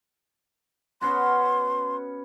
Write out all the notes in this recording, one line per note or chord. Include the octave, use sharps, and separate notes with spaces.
B3 C#4 F#4 C6